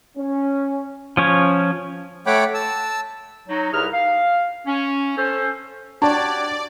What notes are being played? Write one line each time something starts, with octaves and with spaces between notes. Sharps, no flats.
C#4
F3 C#4 C#5
A3 C#5 F#5 G5 B5 D6
A5 E6
F#3 D#4
C2 C3 E4 G#4 B4 F6
F5
C#4
C#4 A4 C5
D4 F#4 G4 C#5 D5 A5